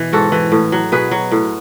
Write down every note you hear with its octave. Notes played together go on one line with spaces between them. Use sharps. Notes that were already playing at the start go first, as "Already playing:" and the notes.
Already playing: B2 E3 E4
G#2 F#4 A4
E3
A2
F#3
B2 G#4 B4
F#3
A2